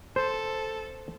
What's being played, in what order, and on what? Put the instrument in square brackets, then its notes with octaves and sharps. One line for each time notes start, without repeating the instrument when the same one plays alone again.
[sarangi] A4 [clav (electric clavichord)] C5